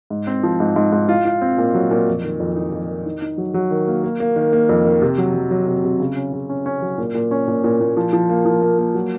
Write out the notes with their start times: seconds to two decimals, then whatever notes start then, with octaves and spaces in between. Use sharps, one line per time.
0.10 G#2
0.27 C4
0.43 F3
0.60 G#2
0.76 G#2
0.92 G#2
1.09 F4
1.25 F4
1.42 C4
1.58 A#2
1.74 F#3
1.91 A#2
2.08 F2
2.24 D#3
2.40 F2
2.56 D#4
2.72 F2
2.89 D#3
3.06 D#4
3.22 D#4
3.38 F#3
3.54 F#3
3.71 D#3
3.88 A#3
4.04 A#3
4.20 A#3
4.36 D#3
4.53 A#3
4.69 F2
4.85 D#3
5.02 C3
5.18 F#3
5.34 F#3
5.51 F#3
5.68 C3
5.84 C3
6.00 C#3
6.16 C#4
6.33 C#3
6.49 C#4
6.66 C#4
6.82 F#3
6.98 A#2
7.14 A#2
7.31 C#4
7.48 A#2
7.64 A#2
7.80 A#2
7.97 F3
8.13 F3
8.29 A#3
8.45 F3
8.62 A#3
8.79 A#3
8.95 F#3